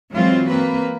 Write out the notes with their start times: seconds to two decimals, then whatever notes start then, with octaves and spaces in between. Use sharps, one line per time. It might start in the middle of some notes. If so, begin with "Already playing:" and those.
0.11 E3 F#3 G#3 C4 F4
0.49 A#3 C4 B4